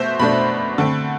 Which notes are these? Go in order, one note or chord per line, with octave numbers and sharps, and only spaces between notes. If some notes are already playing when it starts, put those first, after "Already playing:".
Already playing: B2 A3 C5 E5
B2 A3 D4 B5
D3 A3 C4